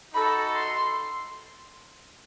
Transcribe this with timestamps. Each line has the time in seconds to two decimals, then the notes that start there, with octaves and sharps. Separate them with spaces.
0.14 D#4 F#4 A4 B5
0.55 C6